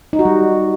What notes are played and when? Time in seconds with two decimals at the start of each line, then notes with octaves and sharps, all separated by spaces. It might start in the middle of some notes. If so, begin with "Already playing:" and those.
0.13 D#4
0.19 F#4
0.25 G3